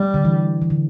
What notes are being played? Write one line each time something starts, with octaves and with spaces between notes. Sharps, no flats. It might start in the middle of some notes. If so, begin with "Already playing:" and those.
Already playing: G3
D3
E3
E3
D3